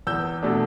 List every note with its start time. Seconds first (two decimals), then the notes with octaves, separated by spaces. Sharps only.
0.07 E2 E6 G6
0.43 B2 A3 D4